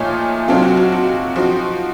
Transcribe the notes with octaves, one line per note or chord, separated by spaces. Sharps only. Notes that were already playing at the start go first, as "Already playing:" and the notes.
Already playing: A#2 F3 A3 D#4 C#5
C3 F#3 C4 D#4 F4 A4
F#4
F#4
F#4
F3 C4 D#4 F#4